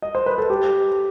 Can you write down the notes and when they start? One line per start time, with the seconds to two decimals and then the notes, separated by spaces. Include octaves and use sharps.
0.02 D#5
0.15 C5
0.26 B4
0.38 A4
0.50 G4